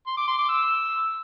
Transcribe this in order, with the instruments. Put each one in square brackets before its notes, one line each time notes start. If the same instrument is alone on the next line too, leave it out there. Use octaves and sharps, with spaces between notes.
[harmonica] C6
D6
C6
D6
E6